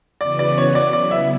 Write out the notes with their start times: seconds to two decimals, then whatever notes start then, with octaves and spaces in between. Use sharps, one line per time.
0.21 C#3 E3 B3 F#4 B4 D5
0.39 D5
0.58 C#5
0.75 D5
0.93 C#3 F#3 B3 E4 D5
1.11 E5